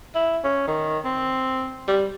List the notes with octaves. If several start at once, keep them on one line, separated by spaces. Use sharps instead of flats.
E4
C#4
D#3
C4
G3